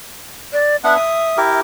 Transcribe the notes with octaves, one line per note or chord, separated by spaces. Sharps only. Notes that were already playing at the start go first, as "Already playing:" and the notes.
D5
B3 D4 E5 F#5
D#6
E4 G4 A#4